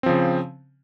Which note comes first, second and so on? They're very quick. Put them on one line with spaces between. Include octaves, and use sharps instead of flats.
C4 F3 C#3